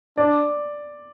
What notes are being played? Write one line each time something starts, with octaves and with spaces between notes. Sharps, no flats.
D4 D5